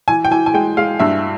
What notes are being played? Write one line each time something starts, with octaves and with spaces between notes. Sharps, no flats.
E3 G#5
G5
E3 G#5
G#5
G#3 G5
G#3 F5
G2 E5